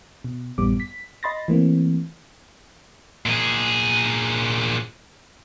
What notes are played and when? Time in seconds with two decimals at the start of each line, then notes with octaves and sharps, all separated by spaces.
0.24 B2
0.58 A1 F#2 A2 G3 B3 D6
0.80 B6
1.23 D#5 B5 C6 A6 A#6
1.48 E3 A3 A#3 C4
3.26 A#2 G#4